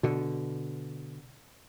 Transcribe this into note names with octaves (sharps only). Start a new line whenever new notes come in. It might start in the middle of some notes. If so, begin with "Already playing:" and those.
B2 D3